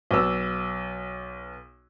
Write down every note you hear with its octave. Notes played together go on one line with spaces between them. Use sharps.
B1 B3 E6